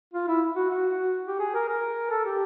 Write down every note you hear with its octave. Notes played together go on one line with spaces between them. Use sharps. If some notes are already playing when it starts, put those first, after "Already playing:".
F4
E4
F#4
F#4
G4
G#4
A#4
A#4
A4
G4